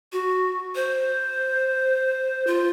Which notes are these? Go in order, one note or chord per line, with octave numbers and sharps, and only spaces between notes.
F#4
C5
F4